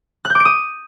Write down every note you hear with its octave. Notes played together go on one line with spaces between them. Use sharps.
F#6
G6
D6
D7
D#6